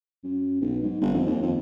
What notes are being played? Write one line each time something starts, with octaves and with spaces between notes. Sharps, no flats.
F#2
B1
G#2
G1
F2
D#2
F2